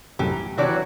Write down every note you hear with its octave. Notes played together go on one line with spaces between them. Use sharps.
C2 F#2 A2 E3 G4
A#5
C3 D#3 F#3 D4 E4 F#4 G4 D5
E3